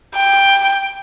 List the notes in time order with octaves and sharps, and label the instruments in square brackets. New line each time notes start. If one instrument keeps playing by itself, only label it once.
[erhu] G5